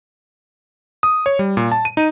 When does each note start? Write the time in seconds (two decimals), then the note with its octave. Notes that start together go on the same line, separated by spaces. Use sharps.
1.03 D#6
1.26 C#5
1.39 G3
1.57 A#2
1.72 A5
1.85 D#7
1.97 D#4